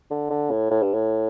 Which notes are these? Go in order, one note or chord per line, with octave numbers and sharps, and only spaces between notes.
D3
D3
A2
A2
G2
A2